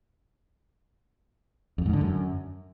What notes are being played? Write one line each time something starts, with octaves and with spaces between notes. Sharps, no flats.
F2
G#2
D3
F#2